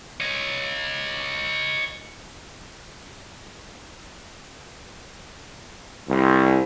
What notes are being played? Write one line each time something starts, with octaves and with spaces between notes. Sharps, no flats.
C#5 D#5
C2